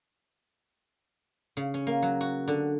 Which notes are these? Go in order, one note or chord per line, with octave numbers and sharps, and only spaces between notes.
C#3
C#4
A#3
F#3
F#4
D3